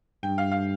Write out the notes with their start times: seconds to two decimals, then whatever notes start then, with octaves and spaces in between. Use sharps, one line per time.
0.23 G2 G5
0.38 F5
0.52 F5